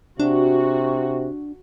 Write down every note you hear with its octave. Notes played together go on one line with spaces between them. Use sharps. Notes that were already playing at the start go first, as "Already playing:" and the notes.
C3 D4 F#4